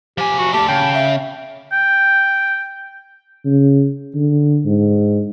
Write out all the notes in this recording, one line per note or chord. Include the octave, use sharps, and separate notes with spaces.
F3 G4 G#5
F#4
A3 D4 G4 A5
C#3 G5
E5
G5
C#3
D3
G#2